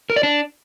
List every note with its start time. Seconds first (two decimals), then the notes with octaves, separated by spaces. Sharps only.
0.10 A#4
0.16 D5
0.23 D4